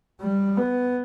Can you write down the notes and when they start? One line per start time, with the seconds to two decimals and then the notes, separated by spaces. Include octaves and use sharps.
0.21 G3
0.57 B3